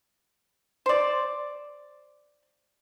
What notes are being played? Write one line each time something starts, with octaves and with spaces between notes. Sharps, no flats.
C5 D5